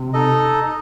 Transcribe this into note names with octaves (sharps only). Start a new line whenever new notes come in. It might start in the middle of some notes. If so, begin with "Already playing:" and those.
Already playing: C3
D#4 A4 D#5